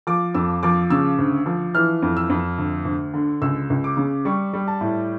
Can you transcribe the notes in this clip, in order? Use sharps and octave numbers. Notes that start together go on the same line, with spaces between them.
F3 D6
F2 E6
F3 D6
C#3 E6
D2
F3
E3 F6
F2
E6
F2
D2
D2
D3
C#2 E6
C#2
D6
C#3
G3 C#6
G3
A5
A2